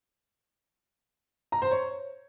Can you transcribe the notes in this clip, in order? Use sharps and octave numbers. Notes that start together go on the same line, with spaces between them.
A#5
C5
C#5